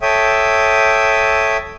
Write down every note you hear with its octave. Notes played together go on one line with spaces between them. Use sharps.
A4 C#5 E5 G5 D#6